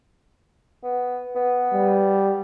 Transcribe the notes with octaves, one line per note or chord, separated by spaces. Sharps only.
B3
B3
G3